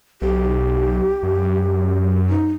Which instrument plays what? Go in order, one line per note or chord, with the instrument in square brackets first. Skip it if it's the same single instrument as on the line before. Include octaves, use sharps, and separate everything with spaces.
[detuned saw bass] B1 [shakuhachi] G4
[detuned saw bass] F#2
[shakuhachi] D#4